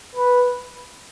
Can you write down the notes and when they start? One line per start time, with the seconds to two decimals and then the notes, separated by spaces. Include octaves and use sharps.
0.16 B4